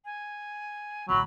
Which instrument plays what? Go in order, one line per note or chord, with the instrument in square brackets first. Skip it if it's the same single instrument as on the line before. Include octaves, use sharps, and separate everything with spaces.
[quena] G#5
[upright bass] A1 D2 [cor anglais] F#3 [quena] B5